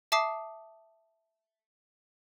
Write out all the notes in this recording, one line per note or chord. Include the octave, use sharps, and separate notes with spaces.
E5 A5 D6 D#6 C7